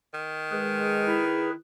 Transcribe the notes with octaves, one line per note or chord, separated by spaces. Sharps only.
D#3
G#3 G#4 B4
E4